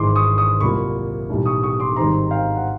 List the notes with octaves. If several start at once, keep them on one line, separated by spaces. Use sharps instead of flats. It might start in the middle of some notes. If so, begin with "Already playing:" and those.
Already playing: G#1 G#2 E3 G#3 C6 D6
C#6 D#6
C#6 D#6
C2 A#2 F#3 A#3 B5 C#6
B1 A2 E3 G3
C#6 D#6
C#6 D#6
C6 D6
G#1 G#2 D#3 G3 C4 A#5 C6
F5 G5
F#5